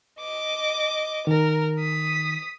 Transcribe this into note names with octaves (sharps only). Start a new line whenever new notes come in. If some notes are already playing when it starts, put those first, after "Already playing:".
D#5 D6
D#3 A#4
D#6 B6